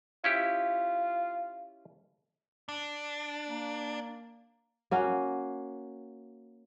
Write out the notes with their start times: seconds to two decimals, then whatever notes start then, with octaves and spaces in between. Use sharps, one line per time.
0.24 C#4 E4 F4 G4
2.69 D4
3.49 A#3
4.91 A#3 C#4 F#4 F5